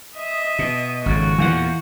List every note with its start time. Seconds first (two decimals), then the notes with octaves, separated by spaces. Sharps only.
0.17 D#5 E5 D#6
0.59 B2
1.06 G#1 F2 C#3 F#4
1.38 E2 A#2 E3 F5 F#5